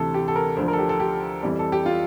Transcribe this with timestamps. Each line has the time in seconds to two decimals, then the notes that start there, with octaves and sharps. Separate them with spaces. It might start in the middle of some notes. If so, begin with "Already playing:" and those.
Already playing: D2 C3 E3 A4
0.14 G4
0.28 A4
0.36 A#4
0.57 D2 D3 F3 C5
0.68 A#4
0.73 A4
0.79 G4
0.89 A4
1.00 G4
1.43 F2 E3 G3
1.59 A4
1.72 G4
1.86 F4